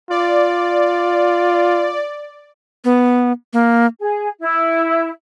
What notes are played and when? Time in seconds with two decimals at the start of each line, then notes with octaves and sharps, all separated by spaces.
0.10 F4 D5
2.85 B3
3.53 A#3
4.00 G#4
4.41 E4